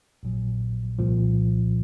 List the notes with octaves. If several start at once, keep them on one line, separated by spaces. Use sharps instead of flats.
A#1 A#2 F#3
C2 A#2 F3